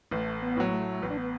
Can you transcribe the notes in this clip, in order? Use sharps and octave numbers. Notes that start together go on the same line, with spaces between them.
A1 A3
B3
A2 F#3
A3
A1 B3
D4
B3